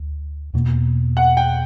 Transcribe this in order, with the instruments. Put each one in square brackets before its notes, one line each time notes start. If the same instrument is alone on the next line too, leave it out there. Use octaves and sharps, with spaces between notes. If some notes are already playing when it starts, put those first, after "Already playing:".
Already playing: [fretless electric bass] D2
E2 B2 A#3
[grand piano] F#5
G5